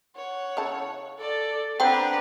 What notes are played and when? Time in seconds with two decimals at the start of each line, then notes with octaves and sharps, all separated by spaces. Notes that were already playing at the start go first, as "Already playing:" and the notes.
0.16 C#5 F#5
0.57 C#3 E4 A5
1.18 A4 D5
1.80 B3 C4 D4 B4 C5 F#5 G5 A#5